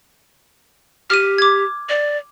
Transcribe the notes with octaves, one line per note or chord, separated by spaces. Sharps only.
G4 F6 D#7
D6 G#6
D5